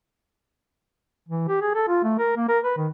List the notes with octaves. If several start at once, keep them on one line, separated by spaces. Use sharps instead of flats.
E3
G4
G#4
A4
F4
A3
A#4
A#3
A#4
B4
D#3